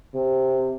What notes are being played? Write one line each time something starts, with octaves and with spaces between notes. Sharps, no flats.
C3